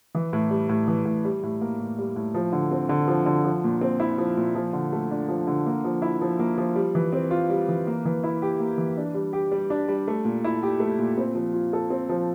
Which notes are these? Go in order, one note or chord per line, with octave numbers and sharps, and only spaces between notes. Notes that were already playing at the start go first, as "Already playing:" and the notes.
E3
A2
G3
A2
E3
A2
G3
A2
A#3
A2
G3
A2
F3
D3
C4
D3
F3
D3
F3
A#2
C4
E4
F3
A#2
F3
D3
A3
D4
F3
D3
A#3
F3
E4
F3
A#3
F3
G3
E3
C4
F4
G3
E3
A#3
E3
E4
G4
A#3
E3
D4
G3
G4
G3
D4
G3
A3
A#2
E4
G4
A3
A#2
C4
F3
F4
A4
C4
F3